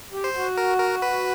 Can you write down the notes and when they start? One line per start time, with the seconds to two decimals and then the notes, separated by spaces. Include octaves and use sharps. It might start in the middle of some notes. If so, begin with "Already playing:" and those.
0.12 G4
0.24 C5
0.35 F#4
0.57 A#4
0.80 A#4
1.02 B4